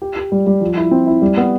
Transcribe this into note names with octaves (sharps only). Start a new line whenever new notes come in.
G4
G4
G3
G3
F3
E4
C4
E4
G3
B3